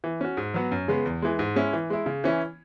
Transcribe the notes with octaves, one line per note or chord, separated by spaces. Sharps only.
E3
C#4 F#4
G#2
F#3 B3 F#4
F#2
C#3 G#3 B3
E2
E3 G#3
G#2
G#3 C#4 E4
E3
G#3 E4
C#3
E3 C#4 E4